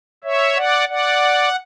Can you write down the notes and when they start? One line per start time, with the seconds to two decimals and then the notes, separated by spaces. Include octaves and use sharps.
0.24 C#5 E5
0.56 D5 F#5
0.89 D5 F#5